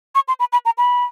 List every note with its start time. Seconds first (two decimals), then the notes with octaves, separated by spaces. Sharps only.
0.15 C#6
0.28 C6
0.40 B5
0.53 B5
0.65 A#5
0.78 B5